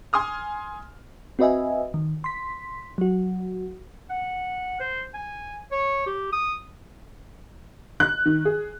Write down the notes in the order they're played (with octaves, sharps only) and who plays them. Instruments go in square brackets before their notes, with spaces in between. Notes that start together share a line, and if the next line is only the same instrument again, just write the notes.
[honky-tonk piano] G#5 C6 D#6 F6
[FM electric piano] C4 F#4 B4 D#5 E5 G#5
D#3
C6 B6
F#3 F#4
[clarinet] F#5
C5
G#5
C#5
G4
D#6
[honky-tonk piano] F#6
D#3
G#4